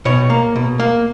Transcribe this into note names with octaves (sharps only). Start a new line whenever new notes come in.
B2 C#5
A#3
B2
A#3